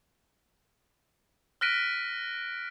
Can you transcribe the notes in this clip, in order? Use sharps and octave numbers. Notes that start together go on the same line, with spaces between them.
F6 F#6 A#6 B6 D7 D#7